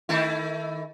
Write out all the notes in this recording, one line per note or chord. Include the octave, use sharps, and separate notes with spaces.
D#3 A3 E4